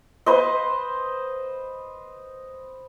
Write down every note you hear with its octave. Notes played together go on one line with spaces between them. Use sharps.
B4 C5 D#5